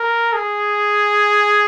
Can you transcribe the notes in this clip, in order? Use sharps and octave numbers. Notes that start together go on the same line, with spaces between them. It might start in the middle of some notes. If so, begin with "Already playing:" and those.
Already playing: A#4
G#4